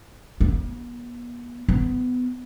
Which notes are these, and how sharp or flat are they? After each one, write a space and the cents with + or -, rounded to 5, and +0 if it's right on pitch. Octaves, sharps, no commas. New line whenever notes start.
B3 -40
B3 +20